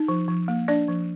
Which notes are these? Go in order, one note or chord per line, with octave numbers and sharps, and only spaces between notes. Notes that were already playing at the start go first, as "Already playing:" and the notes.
Already playing: D#4
F3
F3
A#3
D4 D5
F3